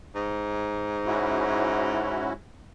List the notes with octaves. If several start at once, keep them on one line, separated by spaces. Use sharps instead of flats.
G#2
C#4 E4 F#4